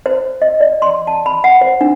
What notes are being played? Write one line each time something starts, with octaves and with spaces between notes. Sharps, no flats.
C5
D#5
D5
C6
A5
B5
F#5
C5
D4